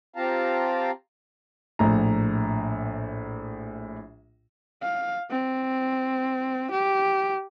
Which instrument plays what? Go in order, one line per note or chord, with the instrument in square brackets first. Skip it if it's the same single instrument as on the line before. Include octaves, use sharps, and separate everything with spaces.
[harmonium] C4 F4 G4 F5 A5 A#5
[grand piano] A#1 A2 A#5
[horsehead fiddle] F5
C4
G4